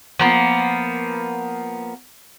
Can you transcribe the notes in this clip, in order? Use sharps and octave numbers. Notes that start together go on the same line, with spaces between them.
F3 A#3 B3